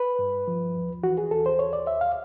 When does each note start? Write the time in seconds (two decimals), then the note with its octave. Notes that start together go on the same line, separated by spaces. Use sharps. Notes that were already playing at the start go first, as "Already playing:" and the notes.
Already playing: B4
0.19 G2
0.48 F3
0.76 D#2
1.03 E3 F#4
1.18 G#4
1.31 D#2 A4
1.46 C5
1.59 D#2 C#5
1.73 D5
1.87 D#2 E5
2.01 F5